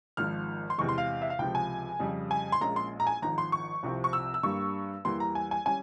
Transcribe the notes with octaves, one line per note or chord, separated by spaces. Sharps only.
G#1 G#2 F3 F6
C6
E2 C3 E3 G#3 C#6
C6
F5
E5
F5
C#2 C3 F3 G5
G#5
F2 C#3 G3
G#5
C6
A#1 A#2 G#3 C#4 A#5
C6
A#5
G#5
G#1 G#2 F3 A#5
C6
C#6
C2 C3 F3 C4
C#6
E6
E6
G2 G3 A#3 C#6
E2 E3 G3 A#3 C6
A#5
G#5
G#5
G3 C#4 G#5